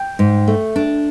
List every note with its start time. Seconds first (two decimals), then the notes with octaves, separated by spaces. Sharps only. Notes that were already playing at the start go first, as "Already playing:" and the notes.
Already playing: G5
0.19 G#2
0.47 A3
0.76 D4